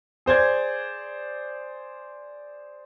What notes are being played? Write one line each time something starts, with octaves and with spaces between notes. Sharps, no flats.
G#4 C5 D5 G#6